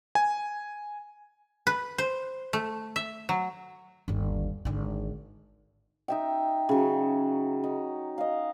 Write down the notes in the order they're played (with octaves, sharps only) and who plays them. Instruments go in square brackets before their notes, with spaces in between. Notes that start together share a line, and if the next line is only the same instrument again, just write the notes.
[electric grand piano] G#5
[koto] B4
C5
A3
E5
F#3
[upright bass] G1 D#2
G#1 D3
[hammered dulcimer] D#4 E5 G5
C#3 F#3
D#4
D#5 F5